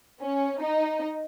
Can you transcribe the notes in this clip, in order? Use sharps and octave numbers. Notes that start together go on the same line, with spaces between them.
C#4
D#4